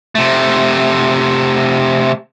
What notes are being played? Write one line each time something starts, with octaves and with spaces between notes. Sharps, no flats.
C3 A3